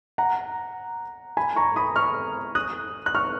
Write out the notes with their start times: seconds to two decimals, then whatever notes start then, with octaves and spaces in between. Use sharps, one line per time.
0.18 F#5 A#5
1.37 G#5 B5
1.56 A#5 C#6
1.76 B5 D#6
1.96 C#6 F6
2.55 D#6 F#6
3.06 F#6
3.15 C#6 F6